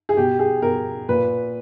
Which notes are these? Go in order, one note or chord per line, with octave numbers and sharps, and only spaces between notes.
G#4
B2 G4
G#4
B2 A#4
A#2 B4